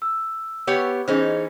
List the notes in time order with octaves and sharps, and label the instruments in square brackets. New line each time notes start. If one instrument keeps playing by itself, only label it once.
[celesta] E6
[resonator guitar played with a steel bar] B3 G4 C#5
[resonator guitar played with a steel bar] E3 C#4 D#4 [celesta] G#4 C5